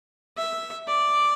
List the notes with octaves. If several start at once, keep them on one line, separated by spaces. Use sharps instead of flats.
E5
D5